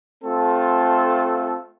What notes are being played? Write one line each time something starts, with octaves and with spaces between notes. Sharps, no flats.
A3 C4 F4 A4